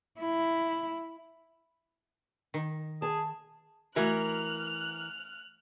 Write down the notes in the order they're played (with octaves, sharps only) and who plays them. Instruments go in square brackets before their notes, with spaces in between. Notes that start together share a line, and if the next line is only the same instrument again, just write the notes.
[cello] E4
[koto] D#3
[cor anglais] G#4 [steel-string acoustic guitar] A5
[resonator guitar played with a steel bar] E3 A#4 [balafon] A3 F#4 [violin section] F6 F#6